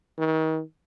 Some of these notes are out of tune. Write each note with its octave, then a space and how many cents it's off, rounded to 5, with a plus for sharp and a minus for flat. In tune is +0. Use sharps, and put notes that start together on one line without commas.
D#3 +35